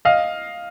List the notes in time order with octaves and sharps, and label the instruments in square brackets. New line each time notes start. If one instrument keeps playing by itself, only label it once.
[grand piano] D#5 F5